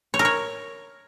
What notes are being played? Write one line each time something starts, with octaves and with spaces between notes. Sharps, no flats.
C#5
A#4
C#5